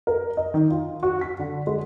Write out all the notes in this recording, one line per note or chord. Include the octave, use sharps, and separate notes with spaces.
A#4
D#5
D#3
F4
F#4
B6
D3
G#3